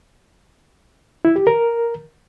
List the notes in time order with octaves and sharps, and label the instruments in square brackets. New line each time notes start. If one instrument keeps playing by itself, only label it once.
[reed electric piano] E4
G4
A#4